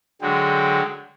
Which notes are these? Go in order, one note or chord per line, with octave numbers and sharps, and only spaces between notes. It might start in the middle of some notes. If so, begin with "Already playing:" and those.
D3 F#3 G#3 G5